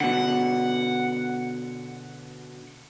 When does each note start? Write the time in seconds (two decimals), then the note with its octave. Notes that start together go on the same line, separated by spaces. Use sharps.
0.01 B2 D3 F#5